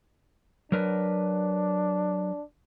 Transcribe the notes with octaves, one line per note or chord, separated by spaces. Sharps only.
F#3 D4 A#4 B4